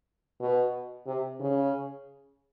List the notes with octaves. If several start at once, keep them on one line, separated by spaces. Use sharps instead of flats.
B2
C3
C#3